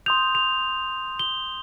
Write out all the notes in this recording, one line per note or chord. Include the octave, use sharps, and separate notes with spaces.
C6 D#6 G6 F7
F7
G7